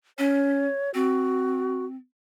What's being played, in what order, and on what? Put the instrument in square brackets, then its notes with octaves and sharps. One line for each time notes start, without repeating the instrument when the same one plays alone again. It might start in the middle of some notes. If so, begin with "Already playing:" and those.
[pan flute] C#4 [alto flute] C#5
[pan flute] C4 [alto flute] F#4